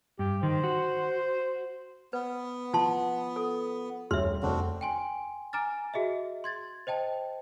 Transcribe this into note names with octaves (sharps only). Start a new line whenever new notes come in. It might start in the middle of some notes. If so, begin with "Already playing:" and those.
G2 G4
D#3 C5
F#4
B3 B4
F3 F4 A5 C6
A4
D#1 C#5 E5 C6 F6
F1 C4 D4 F#4
G5 G#5 C6
G#5 A#5 D6 F6 A6
F#4 G#4 D#5 E5
C6 G#6 A6
C5 D#5 G5 A5